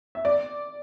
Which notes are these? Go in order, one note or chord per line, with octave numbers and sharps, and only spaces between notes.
E5
D5